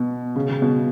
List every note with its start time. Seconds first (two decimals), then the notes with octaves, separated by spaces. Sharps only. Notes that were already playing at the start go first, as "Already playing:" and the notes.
Already playing: B2
0.35 C#3
0.49 C#3
0.62 B2